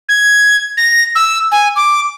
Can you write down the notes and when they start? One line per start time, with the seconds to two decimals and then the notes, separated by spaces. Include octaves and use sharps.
0.09 G#6
0.77 A#6
1.15 E6
1.52 G#5
1.76 D6